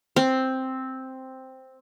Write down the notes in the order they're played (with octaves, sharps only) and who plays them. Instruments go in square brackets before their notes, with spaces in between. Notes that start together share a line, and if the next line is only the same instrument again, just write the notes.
[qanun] C4